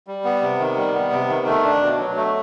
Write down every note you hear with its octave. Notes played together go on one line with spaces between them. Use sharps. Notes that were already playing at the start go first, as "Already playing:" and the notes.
G3
B3
C3
D#3
G3
B3
C3
D#3
A3
D4
B2
F#3
A3